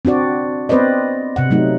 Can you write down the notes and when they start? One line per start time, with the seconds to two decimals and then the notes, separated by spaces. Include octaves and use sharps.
0.05 C4 D4 F#4 D5
0.69 B3 C4 B4 C5 D5 D#5
1.36 C3 F#5
1.51 F#3 A3 D#4